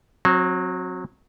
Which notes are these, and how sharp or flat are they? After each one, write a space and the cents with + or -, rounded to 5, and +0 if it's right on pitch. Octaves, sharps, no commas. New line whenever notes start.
F#3 -20 C4 +25